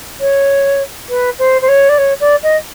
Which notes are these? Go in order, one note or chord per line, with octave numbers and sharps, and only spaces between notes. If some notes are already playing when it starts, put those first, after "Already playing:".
C#5
B4
C5
C5
C#5
D5
C#5
D5
D#5